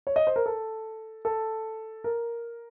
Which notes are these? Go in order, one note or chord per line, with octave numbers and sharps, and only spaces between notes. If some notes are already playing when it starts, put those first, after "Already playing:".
C#5
D#5
C5
A#4
A4
A4
A#4